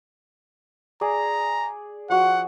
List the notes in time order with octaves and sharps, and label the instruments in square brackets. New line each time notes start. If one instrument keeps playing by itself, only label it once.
[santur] G#4 D5 [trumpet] A#5
[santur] F3 F#4 [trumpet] F#5